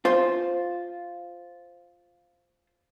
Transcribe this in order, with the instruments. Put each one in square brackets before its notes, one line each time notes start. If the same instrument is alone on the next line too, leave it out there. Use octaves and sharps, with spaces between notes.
[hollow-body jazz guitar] F4 C5